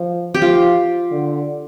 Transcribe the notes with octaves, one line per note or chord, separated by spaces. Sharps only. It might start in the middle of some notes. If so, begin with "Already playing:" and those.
Already playing: F3
G4
F3 F4
D3